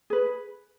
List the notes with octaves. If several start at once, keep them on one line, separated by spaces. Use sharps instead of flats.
G#4 B4